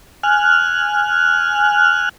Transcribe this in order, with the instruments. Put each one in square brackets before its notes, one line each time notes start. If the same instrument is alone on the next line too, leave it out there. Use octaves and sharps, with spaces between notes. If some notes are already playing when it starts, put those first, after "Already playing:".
[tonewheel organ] G#5 F6 F#6